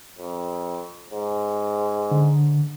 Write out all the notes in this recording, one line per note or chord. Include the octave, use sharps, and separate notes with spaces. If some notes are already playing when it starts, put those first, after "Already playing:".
F2
G#2
D3